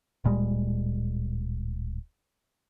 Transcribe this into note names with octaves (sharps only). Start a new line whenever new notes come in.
D1 A#2 G3 G#3